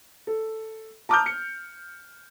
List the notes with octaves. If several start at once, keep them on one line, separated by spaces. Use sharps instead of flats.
A4
A5 A#5 D6 D#6 F6 G6
C#7